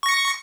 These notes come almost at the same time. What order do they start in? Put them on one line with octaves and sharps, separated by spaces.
C#6 A#6 C#7